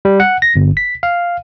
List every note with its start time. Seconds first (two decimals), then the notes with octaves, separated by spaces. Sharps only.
0.05 G3
0.20 F#5
0.42 A#6
0.56 G1
0.77 B6
1.03 F5